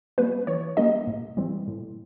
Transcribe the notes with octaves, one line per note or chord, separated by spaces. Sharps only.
G3 A#3 C#4 B4
E3 C#5
G3 A#3 C#4 D#5
A2
E3 G3 C4
A2